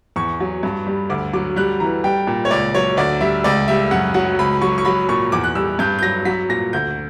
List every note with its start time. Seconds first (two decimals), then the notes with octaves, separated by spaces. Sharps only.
0.16 E2 C#6
0.40 F#3
0.63 G2
0.87 G3
1.10 D2 D6
1.33 F#3 D6
1.56 G3 F#6
1.80 E3 A#5
2.04 G3 G5
2.27 A#2
2.45 C#5
2.51 C#2 D5
2.74 F#3 C#5
2.97 D2 D5
3.21 G3 E5
3.44 C#2 D5
3.68 G3 E5
3.91 F#2 F#5
4.14 F#3 F#5
4.39 C#2 B5
4.61 F#3 C#6
4.78 C#6
4.85 F#3 B5
5.09 A#2 C#6
5.32 E2 D6
5.44 F#6
5.55 G3 E6
5.79 G2 G6
5.99 G6
6.02 F#3 A#6
6.25 F#3 B6
6.49 A#2 A#6
6.73 D2 G6